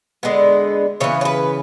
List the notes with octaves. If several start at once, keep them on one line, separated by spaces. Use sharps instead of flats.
D3 G#3 B3
C#3 E3 B3 C#5
C#5
B4